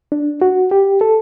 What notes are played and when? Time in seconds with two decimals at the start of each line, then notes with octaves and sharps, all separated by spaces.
0.12 D4
0.42 F#4
0.71 G4
1.01 A4